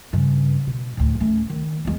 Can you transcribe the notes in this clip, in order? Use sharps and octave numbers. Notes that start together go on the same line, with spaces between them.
G2 C#3
B2
D2 A2
A3 C#4
D#3
E2 G#3